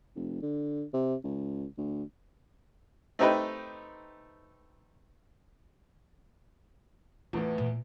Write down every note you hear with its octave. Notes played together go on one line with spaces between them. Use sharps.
F1
D3
C3
C#2
D2
A3 C4 D#4 G4 B4
E2 A2 B3 F4
A#2